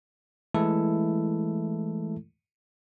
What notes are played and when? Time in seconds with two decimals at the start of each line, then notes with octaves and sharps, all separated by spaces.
0.55 E3 G#3 A3 E4 A4